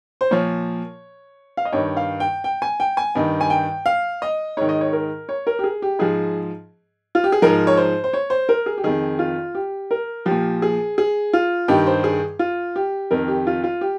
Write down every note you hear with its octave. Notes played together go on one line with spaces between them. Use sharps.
C5
A#2 F3 C#5
F5
D#5
G2 D#3 C#5
F5
G5
G5
G#5
G5
G#5
G2 D#3
G#5
G5
F5
D#5
G#2 D#3 C#5
D#5
C#5
A#4
C#5
A#4
G4
G#4
G4
G#2 F3 G#4
F4
G4
G#4
G#2 F3 A#4
C#5
C5
C5
C#5
C5
A#4
G#4
G4
F2 D#3 G#4
F4
G4
A#4
F3 G4
A#2
G#4
G#4
F4
G2 D#3 G4
C5
G#4
F4
G4
F2 D#3 A#4
G4
F4
F4
G4